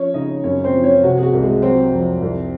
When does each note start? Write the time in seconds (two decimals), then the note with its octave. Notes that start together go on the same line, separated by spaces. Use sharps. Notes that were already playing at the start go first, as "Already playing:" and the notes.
Already playing: F3 C#4 C#5
0.14 C#3 D#4 D#5
0.44 F#2 C#4 C#5
0.64 C4 C5
0.74 F3
0.84 C#4 C#5
1.03 C3 F#4
1.17 G#4
1.23 F#4
1.33 C2
1.42 G#3 G#4
1.62 F#3 C4 C5
1.92 F2
2.22 C2